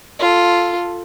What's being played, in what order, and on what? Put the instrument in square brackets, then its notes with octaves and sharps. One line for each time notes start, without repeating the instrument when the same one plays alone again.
[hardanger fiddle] F4 A4